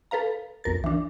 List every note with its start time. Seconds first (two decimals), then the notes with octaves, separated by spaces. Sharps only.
0.11 A4 B4 F5 A#5
0.64 B1 F2 A#4 A6
0.84 E3 D4